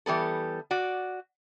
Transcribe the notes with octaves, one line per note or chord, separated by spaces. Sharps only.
E3 G3 B3 A4
F#4 D5